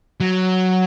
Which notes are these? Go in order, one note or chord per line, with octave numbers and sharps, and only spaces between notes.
F#3